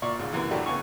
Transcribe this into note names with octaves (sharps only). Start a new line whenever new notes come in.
A#2 D5 C#6
C#2 G#2
F#2 C3 E3 A#3 E4
A2 F#3 A3 D4 G4
C#2 B3 G#5 C#6